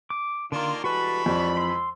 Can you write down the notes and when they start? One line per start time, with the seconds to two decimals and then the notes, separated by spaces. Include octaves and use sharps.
0.10 D6
0.52 D3 D#3 A#3 D4 F4 C6
0.84 E3 G3 G#3 F#4 A4 B4 B5 C#6
1.26 F2 D5
1.57 C6 E6